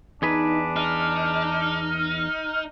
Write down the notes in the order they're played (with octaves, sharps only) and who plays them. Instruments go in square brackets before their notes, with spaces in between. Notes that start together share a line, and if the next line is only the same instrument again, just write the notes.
[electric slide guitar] E2 G#4 B4 [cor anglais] D4 [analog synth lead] D#4
[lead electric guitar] D#4 [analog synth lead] F6